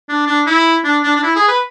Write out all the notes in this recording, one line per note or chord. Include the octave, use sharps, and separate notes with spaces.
D4
D4
E4
D4
D4
D4
E4
G#4
B4